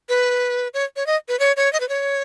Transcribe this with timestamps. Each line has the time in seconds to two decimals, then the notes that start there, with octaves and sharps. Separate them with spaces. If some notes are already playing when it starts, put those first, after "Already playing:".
0.09 B4
0.74 C#5
0.96 C#5
1.07 D#5
1.28 B4
1.40 C#5
1.57 C#5
1.73 D#5
1.80 B4
1.89 C#5